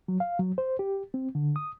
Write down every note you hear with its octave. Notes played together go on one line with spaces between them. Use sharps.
F#3
F5
F#3
C5
G4
C4
D3
D#6